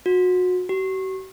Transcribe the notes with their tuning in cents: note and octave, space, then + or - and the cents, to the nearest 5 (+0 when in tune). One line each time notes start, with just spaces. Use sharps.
F#4 -25
F#4 +45